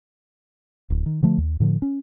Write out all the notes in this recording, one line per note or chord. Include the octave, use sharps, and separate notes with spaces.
D1
D#3
D3 F3 A3
D#2
A2 D3 F3
C#4